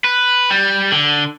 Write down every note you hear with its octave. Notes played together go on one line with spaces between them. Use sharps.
B4
G3
D3